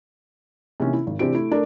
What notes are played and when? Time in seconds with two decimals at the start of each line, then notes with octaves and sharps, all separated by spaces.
0.80 C3 D#3 E3 A#3 C#4
0.93 E4
1.07 G#1
1.19 C3 E3 C4 D4 G4 D7
1.32 A3 E4
1.51 A3 D4 A4 A#4